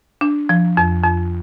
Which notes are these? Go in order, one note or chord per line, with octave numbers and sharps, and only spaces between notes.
D4
F3
F2
F2